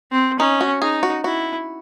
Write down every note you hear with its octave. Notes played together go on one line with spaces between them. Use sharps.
C4
C#4 D#4
F#4
D#4 G#4
F#4
E4 F#4